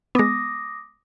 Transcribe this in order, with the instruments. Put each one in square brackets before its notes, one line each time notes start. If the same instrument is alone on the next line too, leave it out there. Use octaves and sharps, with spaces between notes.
[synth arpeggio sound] G#3 B3 [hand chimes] D6 D#6 A#6